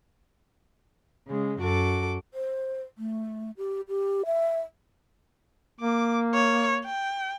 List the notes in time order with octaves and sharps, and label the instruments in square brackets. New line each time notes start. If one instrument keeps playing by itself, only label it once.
[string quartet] C#3 G#3
F#2 F#4 A4 D6
[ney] C5
A3
G4
G4
E5
[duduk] A#3 [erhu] D6
[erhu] C#5
G5